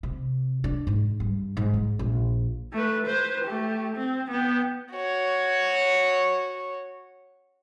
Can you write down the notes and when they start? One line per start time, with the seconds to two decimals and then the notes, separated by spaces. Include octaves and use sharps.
0.03 C3
0.64 D4
0.87 G#2
1.20 G2
1.57 G#2
1.74 G#3
1.99 A#1
2.73 A3 B4
3.06 B4 C5
3.44 A3 G4
3.96 C4
4.31 B3 G5
4.92 F#4 C#5